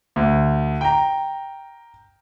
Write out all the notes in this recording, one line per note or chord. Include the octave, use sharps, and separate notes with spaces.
D2
G5 A#5